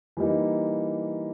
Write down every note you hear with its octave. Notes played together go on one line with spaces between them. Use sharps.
E3 G3 A#3 D#4